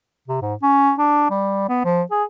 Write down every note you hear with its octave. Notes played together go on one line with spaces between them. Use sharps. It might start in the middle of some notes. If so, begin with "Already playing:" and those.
C3
G#2
C#4
D4
G3
B3
F3
G#4